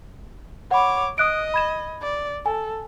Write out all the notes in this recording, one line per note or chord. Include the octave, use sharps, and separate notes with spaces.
C#5 F#5 B5 D6
D#5 D#6 F#6 D7
B5 G#6 E7
D5
A4 G#5